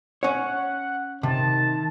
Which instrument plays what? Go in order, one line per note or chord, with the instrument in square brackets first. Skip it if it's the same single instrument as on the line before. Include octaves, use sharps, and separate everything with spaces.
[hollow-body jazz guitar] C#4 C#5 [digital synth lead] F#5
[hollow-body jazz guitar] C3 [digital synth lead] D#3 [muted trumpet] A5